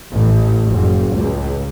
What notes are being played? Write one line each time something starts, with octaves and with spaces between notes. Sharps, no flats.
A1
F#1
C#2